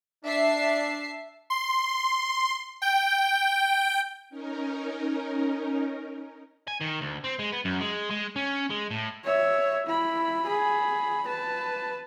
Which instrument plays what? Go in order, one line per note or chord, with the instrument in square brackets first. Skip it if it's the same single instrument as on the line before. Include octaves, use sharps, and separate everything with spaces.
[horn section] D4 [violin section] E5 A5 C7
[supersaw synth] C6
G5
[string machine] C#4 D#4 A#4
[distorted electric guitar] G#5
D#3
D2
C4
G#3
B3
F#2
G#3
G#3
C#4
G#3
A2
[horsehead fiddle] C#5 E5
E4 B5
G#4 B5
B4 A5